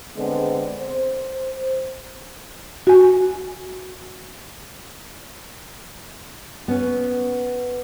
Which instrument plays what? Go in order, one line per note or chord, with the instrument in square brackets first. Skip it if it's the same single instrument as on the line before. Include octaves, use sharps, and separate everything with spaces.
[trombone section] D3 G#3 B3 C4
C5
[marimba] F#4 G#5
[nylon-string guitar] B3 C#4